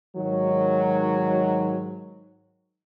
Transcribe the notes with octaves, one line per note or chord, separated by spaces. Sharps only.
G#2 D#3 F#3